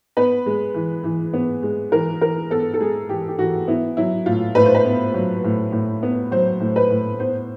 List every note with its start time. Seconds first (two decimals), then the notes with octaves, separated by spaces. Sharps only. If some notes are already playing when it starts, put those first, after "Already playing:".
0.17 B3 B4
0.46 G#3
0.74 E3
1.03 E3
1.34 B3
1.63 G#3
1.92 E3 A#4
2.21 E3 A#4
2.50 B3 A4
2.74 A4
2.80 G#3 G#4
3.09 E3 G4
3.28 G4
3.39 E3 F#4
3.68 B3 E4
3.97 F#3 E4
4.26 A2 F4
4.55 A2 B4
4.66 C5
4.75 B4
4.85 B3
5.14 F#3
5.44 A2
5.72 A2
6.03 B3
6.32 F#3 C5
6.60 A2
6.76 B4
6.90 A2
7.20 B3 C5